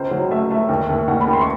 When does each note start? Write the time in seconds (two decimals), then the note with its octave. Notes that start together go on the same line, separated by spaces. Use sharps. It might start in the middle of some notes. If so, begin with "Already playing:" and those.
Already playing: C#2 C5
0.11 F#3
0.31 A3 E5
0.51 A3
0.69 D#2
0.89 D#2
1.08 D#2 F#5
1.21 B5
1.27 D#2
1.33 C6
1.41 C#6